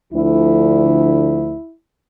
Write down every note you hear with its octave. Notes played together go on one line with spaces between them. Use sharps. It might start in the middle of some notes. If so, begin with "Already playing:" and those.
D2 D3 F3 E4